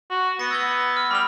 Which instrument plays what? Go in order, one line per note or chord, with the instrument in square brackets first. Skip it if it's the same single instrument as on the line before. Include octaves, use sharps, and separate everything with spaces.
[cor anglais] F#4
[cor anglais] B3 [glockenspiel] A#6 C#7 D#7
[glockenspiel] E6 G#6 G7
F6
[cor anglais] G3 [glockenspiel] B5 F7